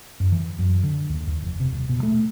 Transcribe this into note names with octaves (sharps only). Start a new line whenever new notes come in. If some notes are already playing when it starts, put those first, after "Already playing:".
F#2
E3
F#2
D3
D#2
D#2
F1
C3
D#1
B2
A3